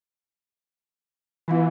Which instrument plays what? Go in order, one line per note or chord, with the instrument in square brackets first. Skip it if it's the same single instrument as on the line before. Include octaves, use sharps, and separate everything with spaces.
[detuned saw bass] E3 [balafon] B3 E4 F4